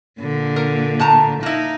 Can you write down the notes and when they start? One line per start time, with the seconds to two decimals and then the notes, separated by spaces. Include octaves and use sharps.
0.20 A#2 D3
0.56 A#4
0.99 A2 A5 A#5
1.43 A#3 D#4 E4